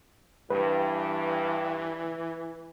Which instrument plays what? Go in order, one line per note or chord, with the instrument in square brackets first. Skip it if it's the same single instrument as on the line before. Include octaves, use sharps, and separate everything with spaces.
[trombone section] G2 [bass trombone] E3 [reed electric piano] B4